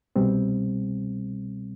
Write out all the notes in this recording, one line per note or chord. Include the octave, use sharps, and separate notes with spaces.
C2 B2 G3 C4